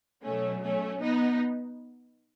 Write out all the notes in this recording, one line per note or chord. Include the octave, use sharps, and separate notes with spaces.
B2 F#3 A3 C#4
A3 C#4
B3 D#4